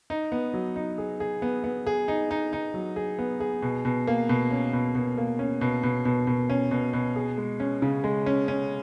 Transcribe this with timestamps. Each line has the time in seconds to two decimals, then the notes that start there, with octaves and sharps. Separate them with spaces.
0.10 D#4
0.32 B3
0.54 F#3
0.76 D#4
0.98 G#4
1.20 G#4
1.42 B3
1.64 B3
1.87 G#4
2.08 D#4
2.31 D#4
2.53 D#4
2.74 F#3
2.96 G#4
3.19 B3
3.40 G#4
3.62 B2
3.85 B2
4.07 A#3
4.29 B2
4.51 C#4
4.73 B2
4.95 B2
5.18 A#3
5.39 C#4
5.61 B2
5.83 B2
6.05 B2
6.27 B2
6.50 C#4
6.71 B2
6.93 B2
7.16 G#4
7.38 G#3
7.60 C#4
7.82 C#3
8.04 G#3
8.26 C#4
8.48 C#4